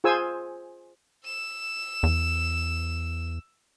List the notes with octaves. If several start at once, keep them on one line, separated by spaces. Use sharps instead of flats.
F4 G#4 C5 G#5 E6
E6 E7
E2